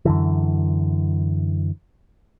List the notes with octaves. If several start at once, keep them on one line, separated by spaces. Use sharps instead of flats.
F#2 D3 E3